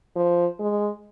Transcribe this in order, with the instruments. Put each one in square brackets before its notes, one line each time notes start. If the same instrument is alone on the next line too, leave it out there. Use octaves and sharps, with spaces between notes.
[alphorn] F3
G#3